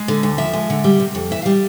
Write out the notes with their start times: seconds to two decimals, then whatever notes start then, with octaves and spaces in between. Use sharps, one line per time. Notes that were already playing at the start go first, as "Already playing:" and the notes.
Already playing: G#3
0.08 D3
0.23 D2
0.38 F3 E5
0.53 G#3
0.70 D3
0.84 G3
1.00 C3
1.15 F2
1.31 E3 E5
1.42 F5
1.46 G3